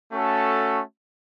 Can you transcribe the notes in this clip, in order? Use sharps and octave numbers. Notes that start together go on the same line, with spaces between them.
A3 C#4 F#4 A4